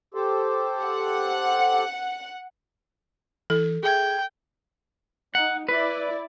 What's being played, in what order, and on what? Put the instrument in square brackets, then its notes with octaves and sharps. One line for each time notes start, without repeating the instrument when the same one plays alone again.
[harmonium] G4 A4 C5
[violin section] F#5
[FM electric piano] E3 [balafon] A4
[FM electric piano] G#4 E5 G#6 [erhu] G5
[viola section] D#4 [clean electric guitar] F#5
[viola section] E4 D5 [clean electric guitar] B4